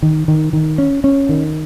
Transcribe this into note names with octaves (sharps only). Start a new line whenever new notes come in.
D#3
D#3
D#3
C#4
C#4
D#3